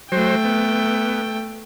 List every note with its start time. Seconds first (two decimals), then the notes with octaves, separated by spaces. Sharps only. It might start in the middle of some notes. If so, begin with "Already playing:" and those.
0.12 F#3 A3 C5 G5
0.44 B3